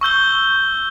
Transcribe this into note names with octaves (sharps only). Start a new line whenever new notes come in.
C#6 E6 G6 G7